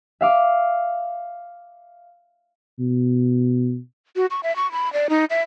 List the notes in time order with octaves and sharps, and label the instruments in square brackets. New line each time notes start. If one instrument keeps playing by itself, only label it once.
[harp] E5 F5 D6
[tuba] B2
[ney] F#4
C#6
E5
C#6
B5
D5
D#4
E5